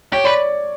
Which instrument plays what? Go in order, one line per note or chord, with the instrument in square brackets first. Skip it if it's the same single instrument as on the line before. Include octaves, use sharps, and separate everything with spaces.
[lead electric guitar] G4 [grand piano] C#5
[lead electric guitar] B4 [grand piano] D5